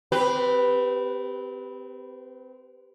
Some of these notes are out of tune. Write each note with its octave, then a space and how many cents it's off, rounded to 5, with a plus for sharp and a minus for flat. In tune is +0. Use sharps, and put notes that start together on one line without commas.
C4 -25 G4 +0 B4 +0